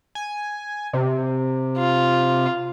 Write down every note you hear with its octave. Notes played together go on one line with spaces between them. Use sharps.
G#5
C3
F4